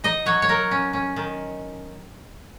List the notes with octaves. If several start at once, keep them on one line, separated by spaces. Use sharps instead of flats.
D#4 D#5
F#3 C#5
C#5
F#3 A#4
C#4
C#4
D#3